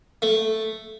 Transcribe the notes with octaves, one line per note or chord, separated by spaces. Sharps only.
A3